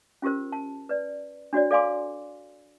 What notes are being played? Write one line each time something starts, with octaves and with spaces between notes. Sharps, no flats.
C#4 F4 G4 A#4 C5
A5
B4 D5
D4 F#4 C#5 D5
A4 D5 F5 G#5 C6 D6